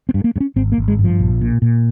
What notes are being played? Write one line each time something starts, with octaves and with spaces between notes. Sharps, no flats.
C4
G2
A#3
G2
C#4
G#1 C4
A#3
G#1
G#3
G2
F3
A#1
A#2
A#2